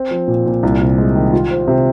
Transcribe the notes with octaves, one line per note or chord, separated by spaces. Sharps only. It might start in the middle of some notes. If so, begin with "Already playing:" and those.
Already playing: C4
F3
A#2
A#2
C2
C3
G#3
D#3
F4
C5
C3